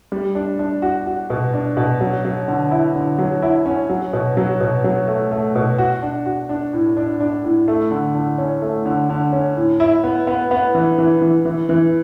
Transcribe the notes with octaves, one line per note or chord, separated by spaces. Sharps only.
G3
D4
D4
F#4
F#4
B2
D4
B2
F#3
F#3
D3
E4
D3
F#3
E4
C#4
F#3
B2
F#3
B2
F#3
A3
A3
B2
F#4
D4
F#4
D4
A2
D4
D4
A2
A3
D3
D3
C#4
A3
D3
D3
C#4
A2
E4
B3
B3
B3
E3
E3
E3
E3
E3